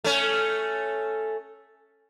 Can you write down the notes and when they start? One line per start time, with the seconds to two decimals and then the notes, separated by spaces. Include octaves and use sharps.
0.04 A3 C#4